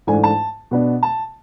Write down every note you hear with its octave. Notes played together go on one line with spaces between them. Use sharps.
G#2 E3 A3 D4 G#5
A5
B2 B3 D4
A5